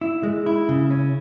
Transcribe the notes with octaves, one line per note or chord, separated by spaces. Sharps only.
E4
G#3
E4
C#3
C#4